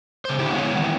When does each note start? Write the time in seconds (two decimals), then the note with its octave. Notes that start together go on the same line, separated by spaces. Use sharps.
0.25 C#3 C5
0.39 D3 E4 G4
0.51 G#3 B3 E4 C#5 F5 F#5
0.73 C3 D#3 E3